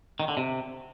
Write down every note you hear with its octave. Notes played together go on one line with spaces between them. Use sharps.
D#3
D3
C3